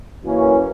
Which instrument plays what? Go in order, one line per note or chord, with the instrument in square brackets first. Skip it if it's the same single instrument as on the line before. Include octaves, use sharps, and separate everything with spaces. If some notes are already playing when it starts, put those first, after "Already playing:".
[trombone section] F#2 E3 A#3 C#4